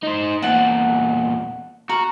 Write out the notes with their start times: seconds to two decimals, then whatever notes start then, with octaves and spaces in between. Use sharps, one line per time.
0.03 D#4 C5
0.42 E2 A#2 F#5 A5
1.89 F#4 A#4